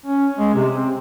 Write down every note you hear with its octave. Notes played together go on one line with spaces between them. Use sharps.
C#4
G#3
C3
C4